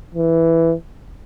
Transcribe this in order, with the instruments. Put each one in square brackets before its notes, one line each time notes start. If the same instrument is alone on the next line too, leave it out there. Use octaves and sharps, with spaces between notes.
[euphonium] E3